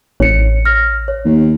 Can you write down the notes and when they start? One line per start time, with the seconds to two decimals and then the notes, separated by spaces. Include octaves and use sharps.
0.20 A1 C#5 C#7
0.65 F6 A#6
1.08 C#5
1.25 D#2